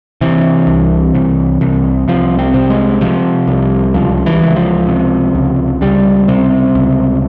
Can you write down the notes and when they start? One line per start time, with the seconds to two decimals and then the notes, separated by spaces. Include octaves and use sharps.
0.21 C3 E3
0.67 C2
1.15 C2
1.61 C2
2.08 C2 F3
2.39 C4
2.54 C3
2.70 G#3
3.01 C3 F3
3.48 C2
3.94 C#2 F3
4.26 E3
4.42 C#2
4.56 F3
4.88 C3
5.35 C#2
5.81 C#2 G3
6.28 C3
6.75 C#2